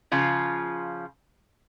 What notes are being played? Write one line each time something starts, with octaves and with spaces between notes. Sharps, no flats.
C#3 F3 F4